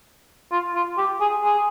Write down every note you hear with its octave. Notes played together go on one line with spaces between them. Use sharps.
F4
F4
G4
G#4
G#4